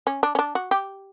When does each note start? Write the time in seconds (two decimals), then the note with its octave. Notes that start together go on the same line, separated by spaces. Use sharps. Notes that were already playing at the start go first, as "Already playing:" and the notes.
0.07 C#4
0.23 D4
0.35 C#4
0.39 D4
0.55 F#4
0.71 G4